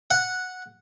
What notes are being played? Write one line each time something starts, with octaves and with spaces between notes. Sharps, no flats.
F#5